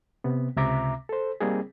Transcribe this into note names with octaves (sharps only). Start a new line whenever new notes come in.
C3 B3
C#2 C3 E5 A#5 D6
A4 C5
G3 A#3 C4 D#4 G#4